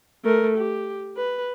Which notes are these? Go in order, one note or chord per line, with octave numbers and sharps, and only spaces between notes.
A3 A#4
G4
B4